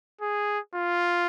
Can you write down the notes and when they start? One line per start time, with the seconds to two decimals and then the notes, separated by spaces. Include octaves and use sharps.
0.21 G#4
0.75 F4